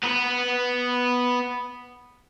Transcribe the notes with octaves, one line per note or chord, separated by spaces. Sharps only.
B3 B4